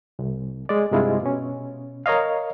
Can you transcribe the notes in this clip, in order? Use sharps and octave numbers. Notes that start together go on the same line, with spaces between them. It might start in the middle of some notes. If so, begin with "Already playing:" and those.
C2
G#3 D5
G2 C3 G#3 E4 F4
B2 C#4
A#4 C#5 D#5 F5